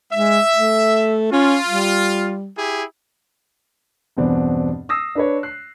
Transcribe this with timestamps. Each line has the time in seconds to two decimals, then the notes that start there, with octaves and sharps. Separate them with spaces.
0.13 G#3 E5
0.55 A3
1.32 C#4 F4
1.68 G3
2.58 E4 G4 G#4
4.17 E2 G2 B2 B3 C4 D4
4.89 D#6 E6 A#6 C7
5.15 D4 B4 C#5
5.43 F#6 C7